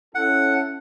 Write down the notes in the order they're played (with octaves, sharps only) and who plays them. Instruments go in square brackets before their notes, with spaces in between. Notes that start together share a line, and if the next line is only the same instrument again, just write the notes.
[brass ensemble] C#4 E4 A4 [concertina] F#5